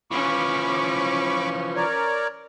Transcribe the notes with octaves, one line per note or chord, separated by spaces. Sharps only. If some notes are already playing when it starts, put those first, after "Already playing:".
E3 F3 C#4 B5 C#6 D6
A#4 C#5 D5